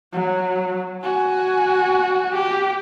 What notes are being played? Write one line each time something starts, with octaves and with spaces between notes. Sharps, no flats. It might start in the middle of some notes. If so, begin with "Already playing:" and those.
F#3
F#4 G#5
G4